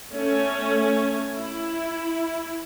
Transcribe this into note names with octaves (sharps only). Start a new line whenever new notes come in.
A3 C#4
E4